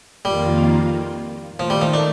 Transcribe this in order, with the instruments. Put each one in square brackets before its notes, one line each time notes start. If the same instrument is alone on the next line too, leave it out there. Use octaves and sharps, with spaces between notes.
[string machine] F2 D#3 A#3 F4 [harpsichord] G3
[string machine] D#3 A3 D#4 [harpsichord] F3
[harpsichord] G3
F3
D4